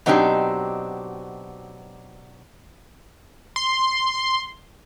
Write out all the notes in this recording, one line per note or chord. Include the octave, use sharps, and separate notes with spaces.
B2 F#3 C4 D4 D#4 G4
C6